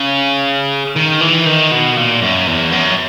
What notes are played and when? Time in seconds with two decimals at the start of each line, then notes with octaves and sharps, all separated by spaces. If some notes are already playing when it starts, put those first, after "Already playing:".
Already playing: C#3
0.96 D#3
1.21 E3
1.46 D#3
1.72 B2
1.97 A#2
2.22 F#2
2.47 E2
2.72 F#2